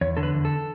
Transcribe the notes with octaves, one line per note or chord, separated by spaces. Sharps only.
E2 C#5
D3 A4
B4
E2
A4